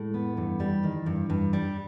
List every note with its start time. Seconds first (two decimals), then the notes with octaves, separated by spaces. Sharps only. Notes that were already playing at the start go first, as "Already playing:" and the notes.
Already playing: A2 G#3
0.14 B3
0.37 G2 E3
0.60 G3
0.83 D#3
1.06 G2
1.30 G2
1.53 G3